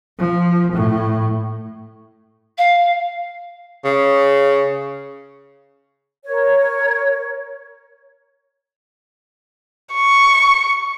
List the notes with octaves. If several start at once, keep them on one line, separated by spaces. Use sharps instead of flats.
F3
A2
F5
C#3
A#4 C#5
C#6